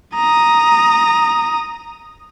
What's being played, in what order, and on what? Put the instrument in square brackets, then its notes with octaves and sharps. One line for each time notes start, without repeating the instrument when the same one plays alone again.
[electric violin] A#5 D#6